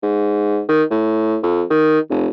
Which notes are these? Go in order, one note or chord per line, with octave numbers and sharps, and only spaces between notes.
G#2
D#3
A2
F2
D#3
F1